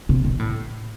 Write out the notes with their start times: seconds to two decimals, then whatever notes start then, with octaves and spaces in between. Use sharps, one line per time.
0.09 C3
0.25 B2
0.39 A2